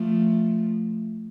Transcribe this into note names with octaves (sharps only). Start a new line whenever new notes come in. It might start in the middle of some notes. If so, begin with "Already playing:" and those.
Already playing: F3 A3